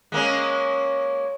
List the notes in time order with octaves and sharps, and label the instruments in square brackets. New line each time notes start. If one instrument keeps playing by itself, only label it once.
[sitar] G#3 A#3 C#4